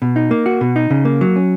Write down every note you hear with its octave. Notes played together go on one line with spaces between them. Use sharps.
B2
D#4
A#3
F#4
B2
D#4
C#3
A#3
F#3
C#4